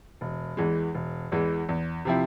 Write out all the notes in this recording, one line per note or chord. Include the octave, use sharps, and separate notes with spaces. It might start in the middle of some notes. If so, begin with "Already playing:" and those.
E1
E2 E3 G#3
E1
E2 E3 G#3
E2
C3 F3 C4 E4